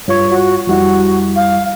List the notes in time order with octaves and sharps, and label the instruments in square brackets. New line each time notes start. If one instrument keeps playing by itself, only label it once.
[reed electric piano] G2 F4 C#6 [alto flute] C#5
[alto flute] F#4
[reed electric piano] F2 G3 E4 [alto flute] F#4
[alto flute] F5